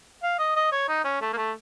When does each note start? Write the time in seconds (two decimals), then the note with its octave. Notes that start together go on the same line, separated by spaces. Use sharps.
0.23 F5
0.39 D#5
0.56 D#5
0.72 C#5
0.88 D#4
1.04 C#4
1.21 A3
1.33 A#3
1.37 A3